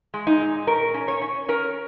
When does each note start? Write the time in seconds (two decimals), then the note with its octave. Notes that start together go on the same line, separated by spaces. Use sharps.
0.14 G#3
0.27 D#4
0.40 A#2
0.67 C#4 A#4
0.94 C#4
1.08 C#5
1.22 C#4
1.49 C#4 A#4